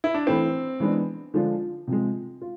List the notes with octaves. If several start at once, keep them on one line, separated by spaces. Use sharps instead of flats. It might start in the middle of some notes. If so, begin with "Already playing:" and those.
E4
D4
E3 A3 C4 E4
E3 G#3 B3 D4
D3 F3 G#3 D4 F4
C3 F3 G#3
F4